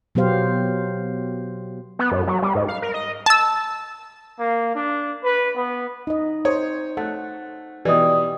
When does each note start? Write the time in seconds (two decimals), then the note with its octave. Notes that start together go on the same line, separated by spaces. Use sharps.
0.15 B2 F#3 B3 G4 C5 F5
1.99 B3
2.11 F#2
2.27 F#3
2.42 G3
2.55 G#2
2.68 F5
2.82 A#4
2.94 D#5
3.26 A5 E6
4.39 A#3
4.75 D4
5.24 B4
5.56 B3
6.07 D#4 D#5
6.45 C5 C#5 D#6
6.97 A3 F#5
7.85 B2 E3 G4 D5 D#5 D#6